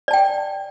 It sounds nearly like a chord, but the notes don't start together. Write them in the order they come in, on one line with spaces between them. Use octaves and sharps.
D5 A5 G5